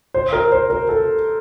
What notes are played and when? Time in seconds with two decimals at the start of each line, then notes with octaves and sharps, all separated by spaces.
0.14 C5
0.33 A#4
0.52 C5
0.70 A#4
0.89 A4